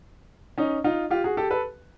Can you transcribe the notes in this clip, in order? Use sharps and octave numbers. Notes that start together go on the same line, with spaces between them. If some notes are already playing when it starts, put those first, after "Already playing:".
C#4 D#4
D#4 F4
F4 G4
F#4 G#4
G4 A4
A4 B4